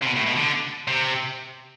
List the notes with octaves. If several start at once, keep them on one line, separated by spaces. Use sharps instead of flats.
C3
B2
A2
B2
D3
C3